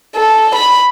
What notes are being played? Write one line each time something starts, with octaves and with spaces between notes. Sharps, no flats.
A4
B5